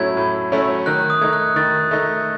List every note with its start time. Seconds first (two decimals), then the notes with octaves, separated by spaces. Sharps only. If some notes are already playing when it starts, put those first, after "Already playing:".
Already playing: A2 F#3 A3 C#4 E4 G#6
0.17 A2
0.52 F#3 A3 C#4 E4
0.86 D#3 F#6
1.10 D#6
1.21 A3 D#4 G#6
1.33 F#6
1.56 D#3 A6
1.91 A3 D#4